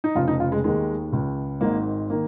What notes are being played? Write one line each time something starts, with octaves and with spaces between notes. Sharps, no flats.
D#4
F1 F2 C#3 F4
D#4
F4
G#3
D#2 D#3 G#3
C#2 C#3
G#1 G#2 D#3 A#3
D#3 A#3